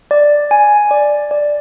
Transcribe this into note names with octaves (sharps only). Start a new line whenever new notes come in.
D5
G#5
D5
D5